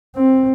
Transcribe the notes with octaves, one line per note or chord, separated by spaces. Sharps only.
C4